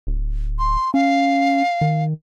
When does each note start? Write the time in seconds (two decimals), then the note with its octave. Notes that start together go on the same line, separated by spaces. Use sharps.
0.07 D1
0.59 C6
0.94 C#4 F5
1.81 D#3